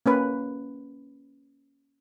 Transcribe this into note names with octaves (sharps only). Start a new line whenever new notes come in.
A#3 C#4 B4